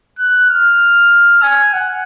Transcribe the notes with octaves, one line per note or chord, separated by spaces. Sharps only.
F#6
F6
G#5
F#5